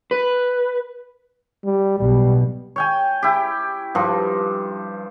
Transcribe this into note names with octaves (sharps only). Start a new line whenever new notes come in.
B4
G3
B1 B2 G3
C#5 G5 G#5
E4 G4
G2 F3